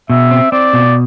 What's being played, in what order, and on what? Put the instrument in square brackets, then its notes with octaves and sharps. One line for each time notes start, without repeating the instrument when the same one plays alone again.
[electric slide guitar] B2 [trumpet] E5
[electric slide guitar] C4
[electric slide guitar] C4 [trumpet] D5
[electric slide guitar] B2